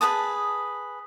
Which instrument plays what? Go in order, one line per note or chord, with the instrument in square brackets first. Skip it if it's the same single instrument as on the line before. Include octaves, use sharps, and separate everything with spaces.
[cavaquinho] G#4 B4 A5 D#6